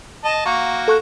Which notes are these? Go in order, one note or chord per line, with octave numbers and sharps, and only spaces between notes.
D#5 A5
A#3 F#4 C#6
A4 C#6 F#6